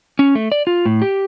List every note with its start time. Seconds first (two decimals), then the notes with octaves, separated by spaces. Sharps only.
0.19 C#4
0.35 A3
0.52 D5
0.67 F4
0.86 A2
1.02 G4